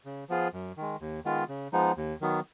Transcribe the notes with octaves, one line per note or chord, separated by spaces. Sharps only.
C#3
F3 B3 F4 G#4
F#2
D#3 G#3
D#2
D#3 G#3 B3 F4
C#3
F3 G#3 B3 D#4
D#2
D#3 F#3 B3